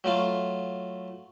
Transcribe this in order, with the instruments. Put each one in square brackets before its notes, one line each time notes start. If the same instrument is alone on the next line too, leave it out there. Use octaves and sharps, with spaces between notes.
[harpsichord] F#3 A3 F4